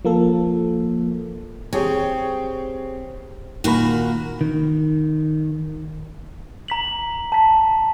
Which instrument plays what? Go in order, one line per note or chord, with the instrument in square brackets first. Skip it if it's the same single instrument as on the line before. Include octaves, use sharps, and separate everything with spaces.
[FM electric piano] F3 A#3 A4
[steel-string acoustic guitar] C4 [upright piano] G4 G#4 C#5
[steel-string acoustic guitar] A#2 A#3 F#4 [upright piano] D#3 B5
[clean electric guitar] D#3
[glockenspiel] A#5 B6 F#7
A5 B6